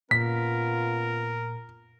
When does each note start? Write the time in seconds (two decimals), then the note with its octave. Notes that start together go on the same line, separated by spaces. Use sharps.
0.11 A#2 B3 C#4 F4 A#4 B6